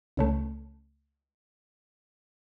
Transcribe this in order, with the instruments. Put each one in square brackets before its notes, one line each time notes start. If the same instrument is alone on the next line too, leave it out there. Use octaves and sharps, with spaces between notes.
[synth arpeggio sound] C#2 C#3 A3